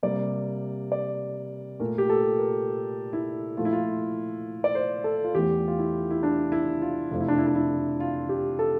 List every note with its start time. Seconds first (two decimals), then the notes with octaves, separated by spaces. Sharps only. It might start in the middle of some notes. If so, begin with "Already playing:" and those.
0.03 C3 G3 A#3 D5
0.92 D5
1.79 A#2 A3 A#4
1.98 G4
2.10 A4
2.39 A#4
3.13 E4
3.57 A#2 F3 A3 F4
3.65 E4
3.73 F4
4.64 D5
4.75 C5
5.04 A4
5.24 F4
5.35 E2 E3 A3 G4
5.68 F4
5.79 E4
6.11 E4
6.23 D4
6.52 E4
6.82 F4
7.11 F2 C3 F3 A3 F4
7.20 E4
7.28 D4
7.38 E4
7.47 D4
7.55 E4
8.00 F4
8.29 G4
8.59 A4